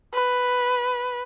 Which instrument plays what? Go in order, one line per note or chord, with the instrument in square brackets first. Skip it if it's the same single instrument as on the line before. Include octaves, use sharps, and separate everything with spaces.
[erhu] B4